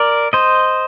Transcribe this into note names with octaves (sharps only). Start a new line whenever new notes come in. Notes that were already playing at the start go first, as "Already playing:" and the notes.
Already playing: A#4 D5
C5 D#5